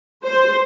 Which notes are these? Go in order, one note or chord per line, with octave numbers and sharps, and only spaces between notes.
C5